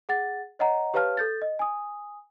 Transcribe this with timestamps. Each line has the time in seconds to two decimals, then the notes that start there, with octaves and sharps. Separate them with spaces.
0.09 G#4 F#5 A6
0.59 C#5 D#5 F#5 A#5
0.94 G4 B4 C#5 F5 A5 F6
1.17 A4 G6 A6
1.42 D#5
1.59 G#5 D#6